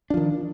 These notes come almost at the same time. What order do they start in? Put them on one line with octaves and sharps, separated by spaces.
D4 F3 D#3